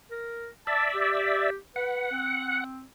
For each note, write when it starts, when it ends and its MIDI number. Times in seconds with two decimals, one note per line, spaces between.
0.11 0.48 70
0.67 1.50 74
0.67 1.50 76
0.67 0.84 81
0.95 1.56 67
1.76 2.09 71
1.76 2.64 78
2.12 2.85 60